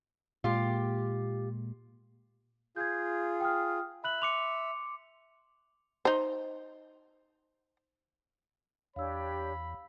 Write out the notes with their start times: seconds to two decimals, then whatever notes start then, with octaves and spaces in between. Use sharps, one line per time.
0.44 A#2 G#3 A#3 F4 G4
2.76 F4 G#4 G6 G#6
3.41 G5 D#6 F6
4.04 E5 B5 F#6 F#7
4.22 C6 D6 C#7 F7
6.05 D#4 C5
8.96 E2 D4 G4 C#5 F5 B5 E6